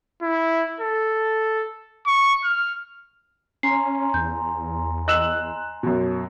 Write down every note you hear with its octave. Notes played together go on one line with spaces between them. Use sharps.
E4
A4
C#6
F6
C#4 G#5 A#5 C6 C7
E2 G6
D#5 E6 F#6 E7 F#7
F#2 B2